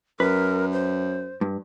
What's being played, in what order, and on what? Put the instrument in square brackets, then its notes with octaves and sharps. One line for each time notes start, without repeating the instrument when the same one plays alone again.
[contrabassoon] F#2 [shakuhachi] A#4 [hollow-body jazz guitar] B4
[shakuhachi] C5
[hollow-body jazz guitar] G2